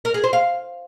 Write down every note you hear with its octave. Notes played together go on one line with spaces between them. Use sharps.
A#4
G#4
C5
F5